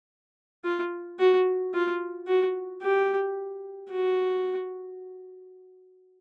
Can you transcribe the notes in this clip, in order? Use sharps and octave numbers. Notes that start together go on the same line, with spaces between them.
F4
F#4
F4
F#4
G4
F#4